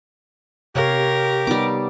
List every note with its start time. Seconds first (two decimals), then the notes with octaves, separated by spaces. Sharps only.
0.75 C3 G4 A#4 C#5 F5
1.47 G3 B3 D#4 D6